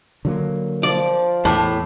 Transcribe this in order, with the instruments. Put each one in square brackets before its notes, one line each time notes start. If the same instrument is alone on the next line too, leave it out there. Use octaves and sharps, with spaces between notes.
[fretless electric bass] D3 F#3 A#3
[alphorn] F3 [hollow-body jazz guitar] D5
[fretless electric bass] E2 [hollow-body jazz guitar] A2 [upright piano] A5 D6